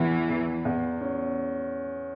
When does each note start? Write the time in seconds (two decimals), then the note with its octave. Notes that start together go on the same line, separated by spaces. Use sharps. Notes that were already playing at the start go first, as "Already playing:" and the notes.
Already playing: E2 E3
0.29 E2
0.65 E2
1.01 C#4